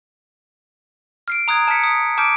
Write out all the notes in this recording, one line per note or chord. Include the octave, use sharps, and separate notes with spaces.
F6 C7 D7
A#5 D#6 F#6 G#6
A5 F6 G#6 B6 C#7
D#6
A5 D6 F6 G6 D7